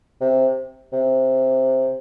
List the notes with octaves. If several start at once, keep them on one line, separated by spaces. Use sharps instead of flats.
C3
C3